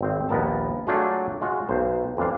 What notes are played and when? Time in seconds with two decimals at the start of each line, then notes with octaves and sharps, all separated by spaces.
0.01 G#1 C4 C5
0.29 A#1 D#2 B3 A#4 A5
0.87 F#3 A3 D4 F4 F#4 G#4
1.41 G#3 F4 F#4
1.69 B1 C5
2.17 F2 E3 D4 F5